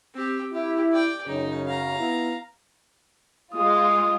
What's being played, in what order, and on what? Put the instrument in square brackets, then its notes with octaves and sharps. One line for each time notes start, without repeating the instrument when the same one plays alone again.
[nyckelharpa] C4 G4
[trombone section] E4 [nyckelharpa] G4
[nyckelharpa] D5 G5
[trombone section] F#2 C#3 [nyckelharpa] D#4
[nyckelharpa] F5 A#5
[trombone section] B3 E4
[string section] G#3 F4 [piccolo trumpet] D#6